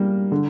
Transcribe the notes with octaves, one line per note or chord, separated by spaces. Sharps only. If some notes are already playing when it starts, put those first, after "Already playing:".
Already playing: G3 A#3
D3